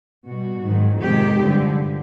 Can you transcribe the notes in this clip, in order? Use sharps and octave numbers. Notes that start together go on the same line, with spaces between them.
B2 G3 F#4
G#2 D#3 F#3
F2 C3 D#3 G#3 G4
G2 D3 F3